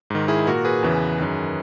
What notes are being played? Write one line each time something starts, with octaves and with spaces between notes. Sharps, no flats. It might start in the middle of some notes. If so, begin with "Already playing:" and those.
G#2 D#3
E4 G#4
A#2 F#4 A#4
G#4 B4
E2 C#3 E3
F#2 D#3